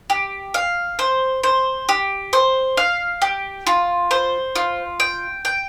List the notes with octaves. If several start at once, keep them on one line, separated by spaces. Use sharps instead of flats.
G4
F5
C5
C5
G4
C5
F5
G4
F4
C5
F4
G5
G5